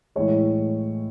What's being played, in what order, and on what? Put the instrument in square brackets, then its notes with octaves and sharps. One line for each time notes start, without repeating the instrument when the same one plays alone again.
[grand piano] A2 E3 G#3 C#5